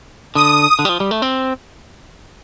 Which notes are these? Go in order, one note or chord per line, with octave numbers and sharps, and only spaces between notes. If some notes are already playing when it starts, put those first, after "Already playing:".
D3 D#6
D3
G3
F3
G3
A3
C4